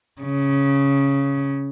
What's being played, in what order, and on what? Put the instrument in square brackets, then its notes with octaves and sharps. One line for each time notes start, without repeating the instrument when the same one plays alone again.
[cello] C#3